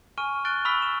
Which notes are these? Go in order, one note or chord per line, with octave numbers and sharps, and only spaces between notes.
G#5 C#6 F6 D#7
F6 F#6 A6 D7 G7
B5 C#6 E6 F6 B6 G7
E7